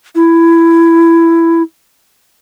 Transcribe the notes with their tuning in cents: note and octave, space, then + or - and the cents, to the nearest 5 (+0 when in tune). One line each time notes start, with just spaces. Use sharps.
E4 +15